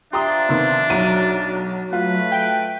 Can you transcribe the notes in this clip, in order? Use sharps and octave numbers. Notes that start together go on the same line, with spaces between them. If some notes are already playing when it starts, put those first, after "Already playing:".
F3 D4 G4 E5 A#5 C6 D#6
C3 D#3 B3
B1 F#3 A#5 D#7
A3 F4 B4
G5